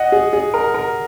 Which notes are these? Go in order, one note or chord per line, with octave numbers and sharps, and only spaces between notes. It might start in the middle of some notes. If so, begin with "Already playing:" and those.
Already playing: D#5 F#5
G#4
G#4
A#4
A#4